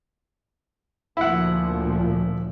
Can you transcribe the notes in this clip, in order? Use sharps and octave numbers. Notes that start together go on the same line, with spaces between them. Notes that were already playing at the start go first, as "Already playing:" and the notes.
D2 A#2 F3 E4 F#5